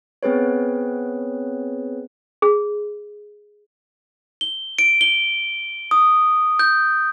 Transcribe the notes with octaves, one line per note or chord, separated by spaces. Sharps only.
B3 C4 G#4 B4 C#5
G#4
G7
D7
G7
D#6
G6